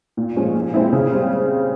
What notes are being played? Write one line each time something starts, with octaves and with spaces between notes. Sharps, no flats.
A#2
F3 G#3 C#4
A#2
G#3 C4 E4
C#3
G3 C4